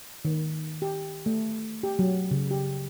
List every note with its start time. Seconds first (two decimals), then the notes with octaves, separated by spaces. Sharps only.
0.25 D#3
0.82 G4
1.26 A3
1.83 G4
1.99 F#3
2.31 C#3
2.51 G4